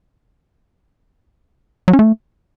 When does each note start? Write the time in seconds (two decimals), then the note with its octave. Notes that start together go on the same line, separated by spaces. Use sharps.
1.88 F#3
1.93 C#4
1.99 A3